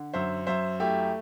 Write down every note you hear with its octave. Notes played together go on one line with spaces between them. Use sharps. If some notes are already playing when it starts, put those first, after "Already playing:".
Already playing: D3
F#2 C5 E5
F#2 C5 E5
A3 E4 G4